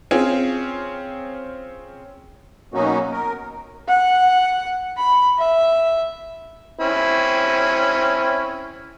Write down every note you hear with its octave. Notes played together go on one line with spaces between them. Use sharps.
C4 C#4 F4 G#4
B2 F#3 A#3 C#4 D#4 F#4
A#4
F#5
B5
E5
C4 C#4 E4